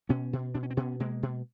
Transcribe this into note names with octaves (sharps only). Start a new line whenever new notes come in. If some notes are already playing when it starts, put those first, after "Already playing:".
B2 B3 C#4
B2
B2 D4
C#4
C4
B2 B3 C#4
B2 G#3 A#3
B2